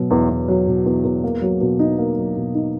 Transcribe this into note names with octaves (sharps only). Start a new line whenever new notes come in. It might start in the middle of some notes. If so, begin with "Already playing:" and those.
Already playing: B2 F#3
E2
E2
F#3
B2
E2
E2
A#3
F#3
B2
D#4
A#3
F#3
B2
D#4